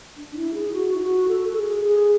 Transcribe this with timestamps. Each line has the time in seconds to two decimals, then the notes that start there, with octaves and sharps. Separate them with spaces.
0.17 D4
0.35 E4
0.54 G#4
0.73 F#4
0.94 E4
1.00 F#4
1.28 A4
1.48 A4
1.56 G#4
1.83 G#4